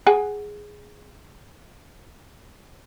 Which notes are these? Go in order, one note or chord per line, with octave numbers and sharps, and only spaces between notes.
G#4 F#5 G#5